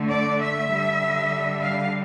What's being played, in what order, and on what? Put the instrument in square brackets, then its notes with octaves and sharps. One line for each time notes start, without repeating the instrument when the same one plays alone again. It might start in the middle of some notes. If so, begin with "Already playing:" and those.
Already playing: [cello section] D3 A3
D5
E5
D3 G3
F5